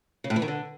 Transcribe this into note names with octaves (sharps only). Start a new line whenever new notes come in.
C#3
A2
E3
D#3
D3